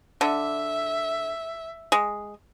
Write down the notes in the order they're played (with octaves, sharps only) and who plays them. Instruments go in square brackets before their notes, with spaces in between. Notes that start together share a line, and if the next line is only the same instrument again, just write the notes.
[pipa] D3 [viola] E5
[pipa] G#3